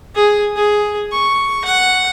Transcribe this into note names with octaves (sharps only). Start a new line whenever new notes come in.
G#4
G#4
C#6
F#5